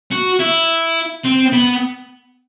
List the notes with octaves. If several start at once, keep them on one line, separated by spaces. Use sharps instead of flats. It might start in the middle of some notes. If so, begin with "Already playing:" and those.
F#4
E4
C4
B3